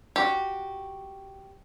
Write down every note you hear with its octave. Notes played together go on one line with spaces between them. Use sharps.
F#4 G4